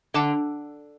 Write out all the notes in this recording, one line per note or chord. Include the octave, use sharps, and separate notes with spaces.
D3 F#5 A5 D6